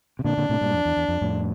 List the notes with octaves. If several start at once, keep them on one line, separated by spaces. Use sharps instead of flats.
C3
A#2 D3 D4
A#2 D3
A2 C3
G2 A#2
F2
E2
E2
F2
F2 A2